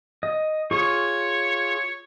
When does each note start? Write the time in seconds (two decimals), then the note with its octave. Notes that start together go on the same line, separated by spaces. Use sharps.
0.23 D#5
0.71 F4 G#4 C#5 C#6